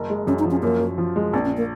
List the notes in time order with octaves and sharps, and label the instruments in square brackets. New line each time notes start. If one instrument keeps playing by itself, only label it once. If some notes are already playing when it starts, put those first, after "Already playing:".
Already playing: [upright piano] F#1
G#3
[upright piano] F#2 [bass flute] C#4
[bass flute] D#4
[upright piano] F3
[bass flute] C#4
[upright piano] F#2 [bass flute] A#3
[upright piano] F#2
F3
G#3
[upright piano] A#1 [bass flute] C4
[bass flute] C#4
A#3